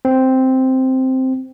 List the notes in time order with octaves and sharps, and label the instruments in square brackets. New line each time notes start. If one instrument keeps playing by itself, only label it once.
[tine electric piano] C4